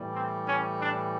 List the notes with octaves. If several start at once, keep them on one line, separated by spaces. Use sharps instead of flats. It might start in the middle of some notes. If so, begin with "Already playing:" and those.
Already playing: A2 E3 G3
C4
C#4
D4